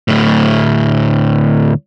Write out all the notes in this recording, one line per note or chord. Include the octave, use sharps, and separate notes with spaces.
D2 A2